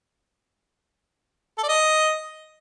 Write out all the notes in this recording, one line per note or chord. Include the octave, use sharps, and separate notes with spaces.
A4
D5
D#5